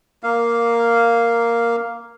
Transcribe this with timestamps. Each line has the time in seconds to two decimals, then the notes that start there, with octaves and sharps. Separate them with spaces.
0.23 A#3 F5